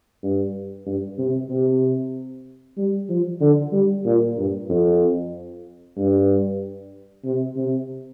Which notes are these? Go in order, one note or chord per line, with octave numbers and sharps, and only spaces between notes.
G2
G2
C3
C3
G3
F3
D3
G3
A#2
G2
F2
G2
C3
C3